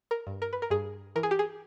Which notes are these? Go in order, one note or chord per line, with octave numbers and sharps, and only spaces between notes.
A#4
G2
A#4
B4
A#4
G2 G#4
E3 A#4
G#4
G4
G#4